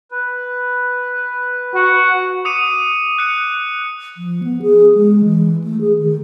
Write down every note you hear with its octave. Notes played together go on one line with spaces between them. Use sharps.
B4
F#4
D6 D#6 C#7 D#7
F#6 C#7
F3
B3
G#4
G#3
E3
A3
G#4
D#3